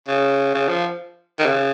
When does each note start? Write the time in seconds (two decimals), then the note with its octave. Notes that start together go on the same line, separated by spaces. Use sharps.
0.08 C#3
0.54 C#3
0.68 F3
1.39 D#3
1.46 C#3